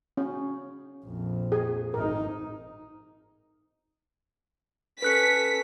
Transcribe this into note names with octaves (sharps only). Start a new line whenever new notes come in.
C#4
A#1 F2
G#4 G#5
G#1 D#4 A#4
C#4 A4 B4 F#6 B6 C#7